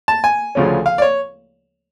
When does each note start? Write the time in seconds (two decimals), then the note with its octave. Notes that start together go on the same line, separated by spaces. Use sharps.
0.08 A5
0.24 G#5
0.55 D2 C#3 F3 A3 C#4
0.86 F5
0.98 D5
1.02 C#5